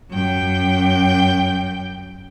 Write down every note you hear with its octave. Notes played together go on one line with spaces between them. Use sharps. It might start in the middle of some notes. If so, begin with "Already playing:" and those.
F#2 G5